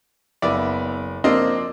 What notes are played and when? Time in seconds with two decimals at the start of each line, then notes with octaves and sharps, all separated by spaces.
0.42 F#1 B3 D5 E5
1.24 F3 A#3 C4 D4 C5 D#5 E6